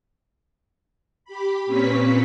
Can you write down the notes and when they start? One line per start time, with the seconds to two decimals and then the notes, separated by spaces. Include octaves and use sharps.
1.24 G4 B5
1.66 A#2 C4 C#4 B4 C#6 B6